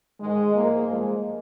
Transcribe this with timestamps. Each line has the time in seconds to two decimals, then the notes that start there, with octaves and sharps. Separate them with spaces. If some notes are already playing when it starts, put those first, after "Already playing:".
0.20 G#2 D#3 G#3
0.54 G#2 F3 A#3
0.87 G2 F3 G#3